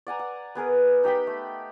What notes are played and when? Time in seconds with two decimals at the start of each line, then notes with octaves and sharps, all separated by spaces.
0.07 D5 F#5 G#5 A#5
0.19 F#5
0.55 B3 G#4 A#4 B4
1.03 D#4 G4 G5 B5
1.27 A3